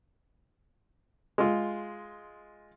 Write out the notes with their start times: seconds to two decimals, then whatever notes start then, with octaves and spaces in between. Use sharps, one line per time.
1.38 G#3 F4